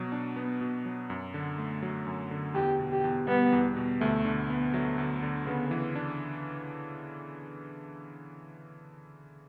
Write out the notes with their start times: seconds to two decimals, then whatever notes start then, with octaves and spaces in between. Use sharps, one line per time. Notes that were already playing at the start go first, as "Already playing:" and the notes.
Already playing: B2 F#3
0.12 D4
0.36 B3
0.61 B2
0.85 F#3
1.10 F#2
1.34 D3
1.58 A3
1.83 F#3
2.07 F#2
2.31 D3
2.55 E2 G4
2.79 B2
2.92 G4
3.04 E2
3.28 G3 B3
3.52 E2
3.77 B2
4.01 D2 A3
4.25 D3
4.50 B3
4.74 F#3 A3
4.98 D2
5.22 D3
5.46 C#3 B3
5.71 E3
5.95 D4